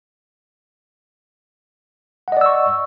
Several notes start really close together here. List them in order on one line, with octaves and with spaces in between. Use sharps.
F#5 D#5 D5 E6 C#6